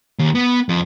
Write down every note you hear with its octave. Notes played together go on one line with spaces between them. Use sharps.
D#2
B3
F2